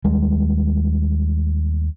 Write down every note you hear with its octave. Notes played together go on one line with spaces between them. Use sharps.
D#2 G3 G#3